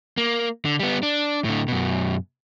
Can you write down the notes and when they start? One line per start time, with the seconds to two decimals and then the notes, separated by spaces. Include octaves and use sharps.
0.18 A#3
0.65 D3
0.80 G3 B3
1.03 D4
1.44 A2 D3
1.68 F#2 B2